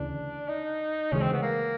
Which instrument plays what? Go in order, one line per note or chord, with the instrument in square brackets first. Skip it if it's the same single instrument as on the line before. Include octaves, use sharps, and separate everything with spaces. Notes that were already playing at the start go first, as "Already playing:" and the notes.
Already playing: [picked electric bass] D2 C#3 E3 [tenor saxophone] D4
[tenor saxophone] D#4
[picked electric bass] D2 C#3 E3 G#3 [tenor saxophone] C#4
[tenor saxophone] C4
B3
A#3